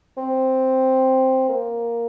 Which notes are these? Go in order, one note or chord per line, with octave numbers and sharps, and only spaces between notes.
C4
A#3